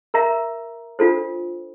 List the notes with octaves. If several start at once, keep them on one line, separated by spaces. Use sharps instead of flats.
A#4 E5 A#5
D4 F4 A4 C5